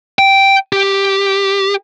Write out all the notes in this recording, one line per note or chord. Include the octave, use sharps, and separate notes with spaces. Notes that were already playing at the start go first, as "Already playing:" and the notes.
G5
G4